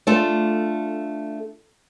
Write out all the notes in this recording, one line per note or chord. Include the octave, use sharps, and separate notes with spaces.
A3 D4 F4 A4